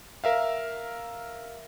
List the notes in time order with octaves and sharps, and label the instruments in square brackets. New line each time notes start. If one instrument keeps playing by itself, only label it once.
[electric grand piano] A#4 E5 F5